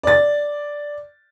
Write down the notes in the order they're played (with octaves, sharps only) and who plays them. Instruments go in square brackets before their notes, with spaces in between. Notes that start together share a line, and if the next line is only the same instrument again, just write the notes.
[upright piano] D5 A6